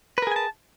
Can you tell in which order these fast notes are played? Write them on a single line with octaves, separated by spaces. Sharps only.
B4 A#4 G#4 G#5 A5